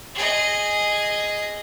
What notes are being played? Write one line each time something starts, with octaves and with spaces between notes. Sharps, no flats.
G#4 D#5